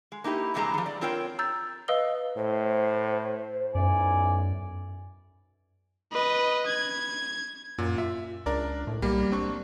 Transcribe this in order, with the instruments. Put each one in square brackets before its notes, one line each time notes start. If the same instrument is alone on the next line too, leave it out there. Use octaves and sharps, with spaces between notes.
[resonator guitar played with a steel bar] G#3
A#3 D#4 E4 G4
G2 C3 E3 G#3 G4 A#5
D#3 F3
D5
C4 F4 A#4 C#5 G5
[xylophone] A#5 E6 G6 A6
B4 D#5 F5 D#6 E6 G7
[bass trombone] A2 [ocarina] C5
[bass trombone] B1 [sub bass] F#2 [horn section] E4 D5 G#5
[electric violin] B4 D#5
G#6
[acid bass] F#2 [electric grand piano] A#2
[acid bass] F4 [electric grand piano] E5
[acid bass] C#2 [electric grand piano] D4 A#4 D5
[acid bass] A2
[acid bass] B1 [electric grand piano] G3 A#3
[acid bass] G3 [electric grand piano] C4 D4 C#6